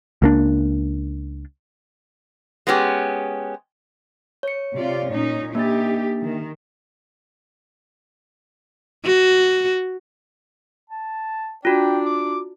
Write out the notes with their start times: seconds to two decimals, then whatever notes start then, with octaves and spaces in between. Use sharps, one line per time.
0.22 C#2 A#3 D4
2.67 G#3 B3 C#4 G4
4.43 C#5 C#7
4.76 C3 F4 D5
5.13 A#2 C#4 D#4
5.55 A#3 D4 D#4 G4 A6
6.22 D#3
9.05 F#4
10.89 A5
11.65 D4 F4 F#4 G5
12.05 D6